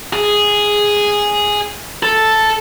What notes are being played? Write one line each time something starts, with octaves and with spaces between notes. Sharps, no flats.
G#4
A4